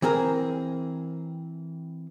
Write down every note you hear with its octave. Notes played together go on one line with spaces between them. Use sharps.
E3 C4 G#4 A#4